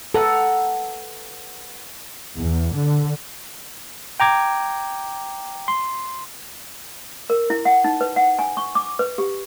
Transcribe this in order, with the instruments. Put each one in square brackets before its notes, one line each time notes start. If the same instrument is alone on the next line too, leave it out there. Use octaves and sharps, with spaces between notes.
[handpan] A4 [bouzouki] B4 F#5 A#5
[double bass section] E2
D3
[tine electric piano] G5 A#5 D6 G#6
C6
[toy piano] A#4
E4
F#5
D#4
B4
F#5
G#5
C#6
D6
B4
G4